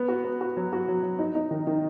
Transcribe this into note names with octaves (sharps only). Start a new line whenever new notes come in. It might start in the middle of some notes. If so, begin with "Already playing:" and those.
Already playing: B3
F#4
B3
F#4
F#3
F#4
F#3
F#3
D#4
D#4
D#3
D#3